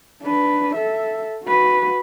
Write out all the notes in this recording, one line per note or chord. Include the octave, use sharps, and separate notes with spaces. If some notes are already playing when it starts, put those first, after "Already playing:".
D4 B4
A4 E5
F#4 B4